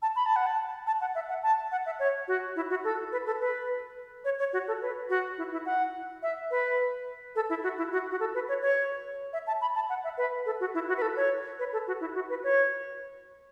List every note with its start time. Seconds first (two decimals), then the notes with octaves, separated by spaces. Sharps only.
0.02 A5
0.16 B5
0.26 A5
0.36 F#5
0.46 A5
0.87 A5
1.01 F#5
1.15 E5
1.29 F#5
1.43 A5
1.72 F#5
1.86 E5
2.00 C#5
2.28 F#4
2.56 E4
2.70 F#4
2.84 A4
3.12 B4
3.26 A4
3.41 B4
4.25 C#5
4.39 C#5
4.53 F#4
4.68 A4
4.82 B4
5.10 F#4
5.38 E4
5.52 E4
5.66 F#5
6.23 E5
6.51 B4
7.36 A4
7.50 E4
7.63 F#4
7.78 E4
7.92 F#4
8.11 F#4
8.20 A4
8.35 B4
8.49 C#5
8.62 C#5
9.33 E5
9.47 A5
9.61 B5
9.75 A5
9.89 F#5
10.04 E5
10.18 B4
10.46 A4
10.60 F#4
10.74 E4
10.88 F#4
10.97 B4
11.02 A4
11.16 C#5
11.59 B4
11.73 A4
11.87 F#4
12.01 E4
12.15 F#4
12.29 B4
12.44 C#5